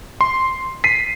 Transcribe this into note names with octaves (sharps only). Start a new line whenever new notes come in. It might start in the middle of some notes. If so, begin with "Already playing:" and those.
C6
B6 C7 D#7